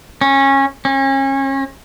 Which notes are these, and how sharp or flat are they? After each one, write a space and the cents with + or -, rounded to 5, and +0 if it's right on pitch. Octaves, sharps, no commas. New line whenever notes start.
C#4 -20
C#4 -35